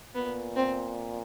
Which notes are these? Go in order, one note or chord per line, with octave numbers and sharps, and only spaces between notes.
A#2 B3
C4